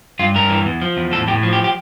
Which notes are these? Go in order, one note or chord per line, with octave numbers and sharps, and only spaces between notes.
G2 F4
G2 A#4
E3
E2
F3
E2
A2 A4
A2 G4
F3
G4
G4